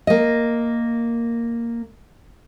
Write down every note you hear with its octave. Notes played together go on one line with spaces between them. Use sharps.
A#3 D#5